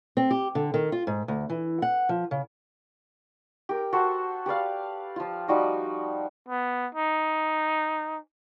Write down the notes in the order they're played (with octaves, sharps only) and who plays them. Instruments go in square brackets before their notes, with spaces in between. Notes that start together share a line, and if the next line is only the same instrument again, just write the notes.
[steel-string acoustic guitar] C4
G4
D3
D#3
F4
G#2
D2
E3
F#5
F3
C#3
[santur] G4 A#4
F#4 A4 C5 E5
G4 B4 D5 F5
F3 F4
F3 G3 D#4 F#4
[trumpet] B3
D#4